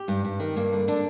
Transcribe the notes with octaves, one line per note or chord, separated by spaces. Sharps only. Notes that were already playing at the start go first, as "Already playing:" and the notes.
Already playing: G4
G2
G2
D#3
G2 A#3
D3
D3 D4